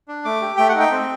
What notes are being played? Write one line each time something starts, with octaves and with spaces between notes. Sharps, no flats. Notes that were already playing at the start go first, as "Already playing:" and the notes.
D4
A3 D6
G4
A3 G5
F#5
D#4
G5
C4